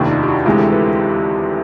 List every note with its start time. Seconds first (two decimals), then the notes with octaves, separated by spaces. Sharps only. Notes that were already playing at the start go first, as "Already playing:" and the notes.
Already playing: F1 D#2 D#3 D4 E4
0.10 D#4 F4
0.23 G4
0.27 E4 F#4
0.45 D2 C3 E3 G#3 F4 G4
0.59 G4 A4
0.72 A4 B4